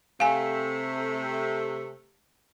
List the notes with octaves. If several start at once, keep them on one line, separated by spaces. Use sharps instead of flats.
C3 A3 F5 G#5